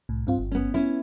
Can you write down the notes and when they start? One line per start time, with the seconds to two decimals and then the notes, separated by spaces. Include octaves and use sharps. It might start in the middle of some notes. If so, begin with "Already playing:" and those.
0.09 C2 A2
0.27 G2 C4 F4
0.39 G1
0.52 B3 C#4
0.74 B3 C#4 E4